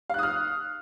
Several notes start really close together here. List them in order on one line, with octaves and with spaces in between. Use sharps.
F5 F#6 D#6 F6